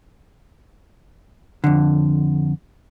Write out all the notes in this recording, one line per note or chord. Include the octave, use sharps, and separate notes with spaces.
F2 D3